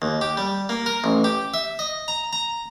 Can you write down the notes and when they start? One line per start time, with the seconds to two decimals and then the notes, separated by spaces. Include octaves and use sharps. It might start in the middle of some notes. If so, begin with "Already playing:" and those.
0.02 D#2
0.21 G4
0.37 G3
0.69 A#3
0.86 A#4
1.04 A1
1.24 G4
1.54 E5
1.79 D#5
2.08 A#5
2.33 A#5